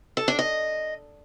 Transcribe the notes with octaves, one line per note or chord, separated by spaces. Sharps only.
A4
D4
D#5